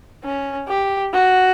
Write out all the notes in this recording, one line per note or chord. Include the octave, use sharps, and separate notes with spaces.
C#4
G4
F#4